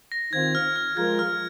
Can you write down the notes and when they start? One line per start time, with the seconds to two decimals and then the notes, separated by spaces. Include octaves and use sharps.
0.12 A#6
0.33 D#3 C4 F4 G#6
0.55 F6
0.76 F6
0.97 F3 G#3 F4 A#4 G#6
1.19 F6